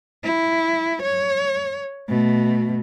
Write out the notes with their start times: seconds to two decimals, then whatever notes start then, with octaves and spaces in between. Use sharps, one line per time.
0.24 E4
1.02 C#5
2.08 B2 A3